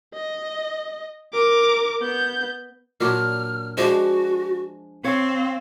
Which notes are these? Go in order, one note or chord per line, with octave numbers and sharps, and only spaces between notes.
D#5
A#4 D6
B3 G6
A#2 F#3 D4 F6
F3 G#3 D4 F#4 C5
C4 C#5 F5